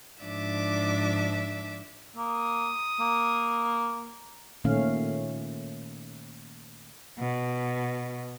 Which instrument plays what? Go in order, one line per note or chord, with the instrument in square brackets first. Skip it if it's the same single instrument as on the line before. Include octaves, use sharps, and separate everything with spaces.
[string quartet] G#2 F3 D4 E5 D6
[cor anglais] A#3 [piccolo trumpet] D#6
[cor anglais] A#3
[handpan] A#2 D#3 A3 C#4 F5
[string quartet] B2